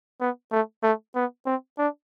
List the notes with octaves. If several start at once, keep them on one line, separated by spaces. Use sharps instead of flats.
B3
A3
A3
B3
C4
D4